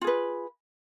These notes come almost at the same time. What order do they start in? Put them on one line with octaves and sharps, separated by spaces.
F4 G#4 B4